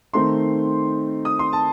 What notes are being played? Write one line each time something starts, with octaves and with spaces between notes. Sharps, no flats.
D#3 A3 C4 D#4 C6
D#6
C6
A5